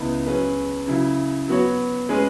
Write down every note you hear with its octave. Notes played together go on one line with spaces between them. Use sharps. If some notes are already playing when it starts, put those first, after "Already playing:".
Already playing: C#2 C#3 G#3 B3 E4
F#3 C#4 G#4 B4
C#3 F#3 E4
F#3 B3 F#4 C#5
G#3 C#4 G#4 B4